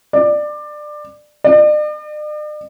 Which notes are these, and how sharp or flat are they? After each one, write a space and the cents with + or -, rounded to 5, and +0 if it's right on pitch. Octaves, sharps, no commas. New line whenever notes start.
D5 +20
D5 +45